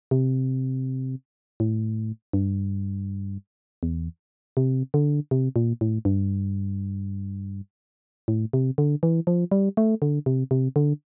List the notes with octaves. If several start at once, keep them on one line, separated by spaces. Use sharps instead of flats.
C3
A2
G2
E2
C3
D3
C3
A#2
A2
G2
A2
C3
D3
E3
F3
G3
A3
D3
C3
C3
D3